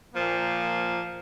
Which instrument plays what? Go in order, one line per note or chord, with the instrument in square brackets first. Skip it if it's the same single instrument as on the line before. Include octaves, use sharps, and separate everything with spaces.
[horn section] A#2 F3 A#3